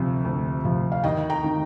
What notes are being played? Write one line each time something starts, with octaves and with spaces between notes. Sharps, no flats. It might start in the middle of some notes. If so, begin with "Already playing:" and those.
Already playing: D2 C3 F3
D2
C3 F3
F5
D#2 D#5 G5
G5 A#5
D#3